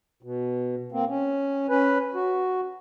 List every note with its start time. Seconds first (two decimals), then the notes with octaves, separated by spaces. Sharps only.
0.23 B2
0.92 A#3 C4
1.08 C#4
1.69 C#4 B4
2.14 F#4